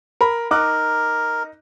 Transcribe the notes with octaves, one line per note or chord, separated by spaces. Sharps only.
A#4 B5
D#4 A#4 D6 F#6